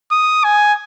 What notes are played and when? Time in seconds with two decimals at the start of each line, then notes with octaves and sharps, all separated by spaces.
0.11 D#6
0.44 G#5